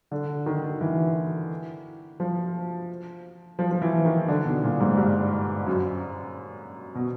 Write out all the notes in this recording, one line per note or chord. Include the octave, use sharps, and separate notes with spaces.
D3
D#3
E3
F3
F3
F3
E3
D#3
D3
B2
A#2
G#2
G2
F#2
B2